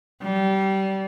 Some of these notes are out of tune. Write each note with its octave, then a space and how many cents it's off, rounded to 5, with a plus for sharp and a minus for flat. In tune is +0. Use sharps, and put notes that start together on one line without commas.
G3 -25